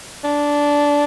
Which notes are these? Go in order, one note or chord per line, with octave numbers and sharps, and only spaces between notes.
D4